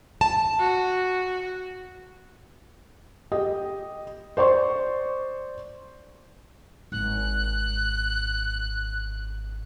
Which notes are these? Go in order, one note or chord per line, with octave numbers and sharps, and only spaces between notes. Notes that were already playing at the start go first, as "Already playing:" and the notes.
A5
F#4
G4 D#5
C5 D5 C6 C#6
G#1 F#6